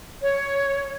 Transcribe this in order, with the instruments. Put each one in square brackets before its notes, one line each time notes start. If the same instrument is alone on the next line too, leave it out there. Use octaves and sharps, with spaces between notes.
[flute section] C#5